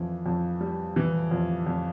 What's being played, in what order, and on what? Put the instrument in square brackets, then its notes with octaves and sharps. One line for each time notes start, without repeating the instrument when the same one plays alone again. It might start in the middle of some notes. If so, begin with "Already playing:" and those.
Already playing: [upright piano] F2 E3
F2
G3
E3
F2
F2